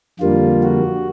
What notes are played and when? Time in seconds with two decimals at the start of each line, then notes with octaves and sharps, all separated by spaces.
0.20 F2 D3 G3 A#3 F4
0.63 F#4